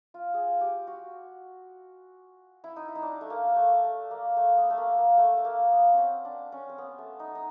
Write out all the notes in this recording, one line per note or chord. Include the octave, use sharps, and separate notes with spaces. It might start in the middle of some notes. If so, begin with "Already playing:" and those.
F4
G#4
G4
F#4
E4
D#4
E4
D#4
D4
A3
A#3
A3
A3
A#3
A3
B3
A3
A#3
A#3
A3
A3
A#3
B3
C#4
C4
D4
C#4
C4
B3
A3
D#4
D#4